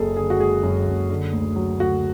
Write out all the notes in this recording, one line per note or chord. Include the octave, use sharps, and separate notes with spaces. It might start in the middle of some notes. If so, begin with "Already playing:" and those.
Already playing: F#1 F#2 G#4 A4
D3 G#4
F#4
G#3 G#4
F#2
F#1
D3
D2
F#3
D2 F#4